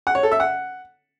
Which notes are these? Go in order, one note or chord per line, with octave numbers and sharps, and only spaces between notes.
F#5
C#5
A4
E5
F#5